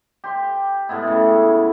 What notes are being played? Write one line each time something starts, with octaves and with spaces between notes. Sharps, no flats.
G4 C6
A2 G#3 B3 E4
C#3